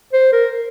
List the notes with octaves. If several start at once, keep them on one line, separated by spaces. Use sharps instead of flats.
C5
A#4